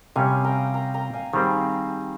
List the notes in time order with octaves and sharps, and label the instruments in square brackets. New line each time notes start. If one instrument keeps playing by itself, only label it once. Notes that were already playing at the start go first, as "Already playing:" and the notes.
[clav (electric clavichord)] C3 G3 C#4 [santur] F5 G#5
[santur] G5 A#5
G5 A#5
G5 A#5
F5 G#5
[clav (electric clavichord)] D#3 G3 C4 [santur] G#4 C5